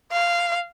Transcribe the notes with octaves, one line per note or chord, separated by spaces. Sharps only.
F5